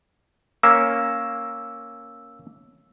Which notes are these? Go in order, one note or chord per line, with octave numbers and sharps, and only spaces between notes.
A#3 C#4 E6